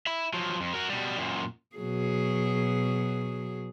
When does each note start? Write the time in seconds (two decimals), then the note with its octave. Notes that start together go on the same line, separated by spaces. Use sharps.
0.07 E5 B5
0.33 F3 F#3
0.61 F2
0.73 F#4 A#4
0.90 B2 G3
1.18 F#2 A#2
1.76 B2 F#3 G#4